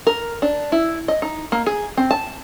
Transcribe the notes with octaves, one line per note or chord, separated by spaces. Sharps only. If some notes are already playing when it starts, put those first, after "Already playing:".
A#4
D4
E4
D#5
D#4
A#3
G#4
C4
A5